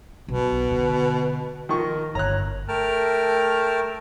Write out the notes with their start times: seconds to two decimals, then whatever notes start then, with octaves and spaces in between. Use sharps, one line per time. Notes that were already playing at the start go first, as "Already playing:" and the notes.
0.28 B1 B2
0.71 D3
1.69 D#3 F3 A#4 C#6
2.15 G1 C#5 A#5 F#6
2.68 A3 A#4 G5 A5 F6